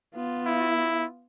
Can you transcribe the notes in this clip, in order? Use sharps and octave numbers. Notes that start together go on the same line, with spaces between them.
B3 F4
E4